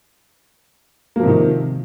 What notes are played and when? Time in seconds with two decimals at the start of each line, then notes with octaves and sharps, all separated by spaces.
1.16 A#3
1.20 F3
1.23 C3
1.27 D#3